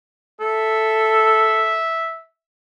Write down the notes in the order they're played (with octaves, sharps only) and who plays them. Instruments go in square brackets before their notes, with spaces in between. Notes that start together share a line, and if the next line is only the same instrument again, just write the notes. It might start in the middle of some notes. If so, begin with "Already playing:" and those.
[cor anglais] A4 [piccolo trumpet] E5